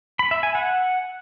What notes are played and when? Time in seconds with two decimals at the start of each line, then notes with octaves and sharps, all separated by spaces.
0.19 B5
0.31 E5
0.43 G#5
0.55 F#5